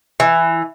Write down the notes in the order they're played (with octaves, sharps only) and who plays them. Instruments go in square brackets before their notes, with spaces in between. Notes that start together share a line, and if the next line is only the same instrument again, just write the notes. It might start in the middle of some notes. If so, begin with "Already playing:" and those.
[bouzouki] E3